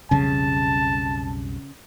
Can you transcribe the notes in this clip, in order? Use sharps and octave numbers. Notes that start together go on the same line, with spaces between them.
B1 F2 C#3 G3 A5